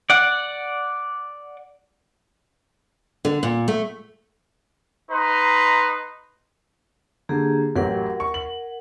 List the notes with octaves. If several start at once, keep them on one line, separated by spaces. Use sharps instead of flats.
D5 F#5
D3
A#2
A3
D#4 B4 A#5 C6
D3 A#3 G4 G#4
A1 F#3 G4 A#4 F#5
C#6
F#7